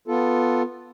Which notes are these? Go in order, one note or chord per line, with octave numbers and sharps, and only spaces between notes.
B3 F4 A4